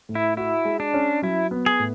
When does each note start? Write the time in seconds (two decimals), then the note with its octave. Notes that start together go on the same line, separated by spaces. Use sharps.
0.09 A2
0.15 E4
0.37 E4 F#4
0.65 G#3
0.80 D4
0.94 C#4
1.22 F#3 E4
1.51 B3
1.66 G#4
1.80 A2